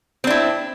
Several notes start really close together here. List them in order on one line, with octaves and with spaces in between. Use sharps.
C4 D4 E4